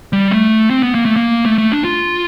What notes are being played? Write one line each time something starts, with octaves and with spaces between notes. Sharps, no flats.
G3
A3
C4
B3
A#3
A3
A#3
A3
A3
D4
F4